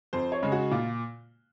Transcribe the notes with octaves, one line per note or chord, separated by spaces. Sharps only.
F2 C5
C#5
C#3 G#3
F#4
A#2 F4